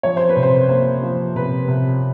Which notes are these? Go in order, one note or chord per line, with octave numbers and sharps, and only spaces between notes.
F3 C#5
C5
B4
C3
C5
A#3 C5
F3
C3 B4
C3